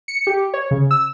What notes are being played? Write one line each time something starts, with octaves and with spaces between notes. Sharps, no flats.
C#7
G4
C#5
C#3
E6